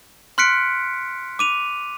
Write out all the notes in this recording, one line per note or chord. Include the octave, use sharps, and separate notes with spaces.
C6 F6 F#6 B6 C#7 D7
D6 D#7 F7